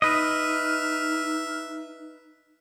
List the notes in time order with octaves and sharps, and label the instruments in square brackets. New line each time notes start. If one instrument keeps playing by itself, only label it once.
[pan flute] D#4 [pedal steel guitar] B4 D#5 [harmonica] E5 [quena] F6